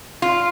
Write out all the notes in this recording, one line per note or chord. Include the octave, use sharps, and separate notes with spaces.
F4